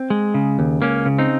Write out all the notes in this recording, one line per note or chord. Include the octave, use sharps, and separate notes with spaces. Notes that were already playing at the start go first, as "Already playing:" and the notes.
Already playing: C4
G#3
C#3
D#2
C#2 A#3 C#4
C#3
C4 D#4